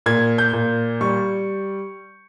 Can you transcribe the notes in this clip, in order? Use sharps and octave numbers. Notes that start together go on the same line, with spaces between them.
A#2 G#6
G6
A#2
G3 C#6